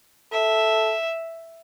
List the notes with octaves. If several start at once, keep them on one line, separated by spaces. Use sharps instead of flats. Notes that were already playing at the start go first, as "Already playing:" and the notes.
A4 E5